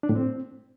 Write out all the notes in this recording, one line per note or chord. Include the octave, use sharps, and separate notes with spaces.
D4
A2
C4